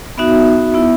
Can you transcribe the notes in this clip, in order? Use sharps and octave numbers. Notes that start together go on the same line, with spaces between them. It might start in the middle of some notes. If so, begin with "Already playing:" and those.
B3 D#4 F#4 E5
B3 E4